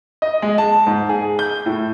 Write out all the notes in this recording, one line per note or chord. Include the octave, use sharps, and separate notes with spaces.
D#5
G#3
A5
G#2
G#4
G6
A2